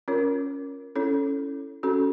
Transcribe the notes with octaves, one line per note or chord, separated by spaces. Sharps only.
C#4 F4 A#4 C#5
C#4 E4 A4 C#5
C#4 F#4 A4